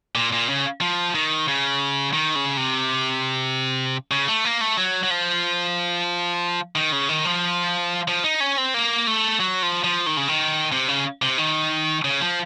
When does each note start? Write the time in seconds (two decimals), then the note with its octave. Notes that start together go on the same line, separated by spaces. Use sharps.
0.15 A#2
0.32 A#2
0.49 C#3
0.81 F3
1.15 D#3
1.48 C#3
2.13 D#3
2.35 C#3
2.57 C3
4.11 C#3
4.28 A3
4.45 A#3
4.61 A3
4.77 F#3
5.03 F#3
5.10 F3
6.75 D#3
6.92 C#3
7.09 D#3
7.25 F3
8.08 F3
8.24 D#4
8.40 C#4
8.58 C4
8.74 A#3
9.07 A3
9.40 F#3
9.63 F3
9.84 F3
10.06 D#3
10.17 C#3
10.28 D#3
10.72 C3
10.88 C#3
11.22 C3
11.38 D#3
12.05 C#3
12.21 F3